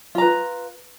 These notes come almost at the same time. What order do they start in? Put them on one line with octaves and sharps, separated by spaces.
F4 A#5 B4